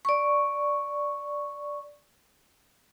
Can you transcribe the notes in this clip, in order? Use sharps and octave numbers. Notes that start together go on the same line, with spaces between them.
D5 C#6